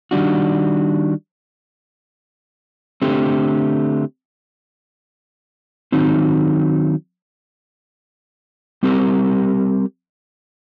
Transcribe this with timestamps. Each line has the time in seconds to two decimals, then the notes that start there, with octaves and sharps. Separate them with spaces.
0.11 D#3 G3 D4 F#4
3.02 D3 A3 C4 G4
5.92 D#3 F#3 C4 D#4
8.83 G3 C4 G4 A#4